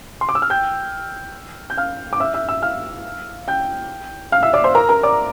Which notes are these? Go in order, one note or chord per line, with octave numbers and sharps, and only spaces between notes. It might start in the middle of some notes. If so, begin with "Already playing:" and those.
C6
D6
E6
F6
G5 G6
G6
F5 F6
D6
E5 E6
E5 E6
E5 E6
F5 F6
G5 G6
F5 F6
E5 E6
D5 D6
C5 C6
A#4 A#5
A#4 A#5
D5 D6